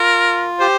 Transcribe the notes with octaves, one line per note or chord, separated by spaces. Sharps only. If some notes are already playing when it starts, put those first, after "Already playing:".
Already playing: F4 A#4
G4 C5